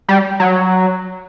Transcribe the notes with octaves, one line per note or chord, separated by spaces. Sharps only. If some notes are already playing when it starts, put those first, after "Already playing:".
G3
F#3